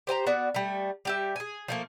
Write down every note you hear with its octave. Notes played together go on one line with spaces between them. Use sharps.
G4 C5 G#5 A#5
B3 F#4 D5
G3 A3
G3 G4 E5
G#4 G#5
F3 A3 A#3